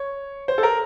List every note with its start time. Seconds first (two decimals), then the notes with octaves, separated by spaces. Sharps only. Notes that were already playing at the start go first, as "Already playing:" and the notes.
Already playing: C#5
0.48 C5
0.58 A4
0.63 A#4